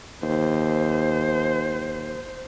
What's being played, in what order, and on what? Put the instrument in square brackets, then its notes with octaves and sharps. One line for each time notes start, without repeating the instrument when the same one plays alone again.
[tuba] D#2 [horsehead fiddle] C5